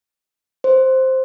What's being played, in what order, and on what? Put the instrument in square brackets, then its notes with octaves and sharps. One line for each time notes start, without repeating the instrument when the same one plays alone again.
[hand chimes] C5